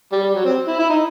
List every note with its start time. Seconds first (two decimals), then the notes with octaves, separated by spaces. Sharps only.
0.12 G3
0.23 G3
0.35 F#3
0.45 C4
0.67 E4
0.79 E4
0.90 D#4